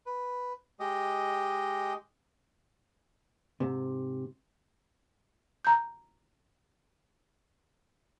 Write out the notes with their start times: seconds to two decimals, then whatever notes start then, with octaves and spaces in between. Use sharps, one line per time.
0.06 B4
0.80 G#3 G4 D#5
3.60 G#2 C3
5.65 A#5 G6